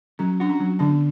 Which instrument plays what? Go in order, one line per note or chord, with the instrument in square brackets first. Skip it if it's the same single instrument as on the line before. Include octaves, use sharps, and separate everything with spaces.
[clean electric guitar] F#3 [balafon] C#4
[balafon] D4 [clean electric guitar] F#4
[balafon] C#4
[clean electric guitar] F#3
[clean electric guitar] D3 [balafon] B3 D4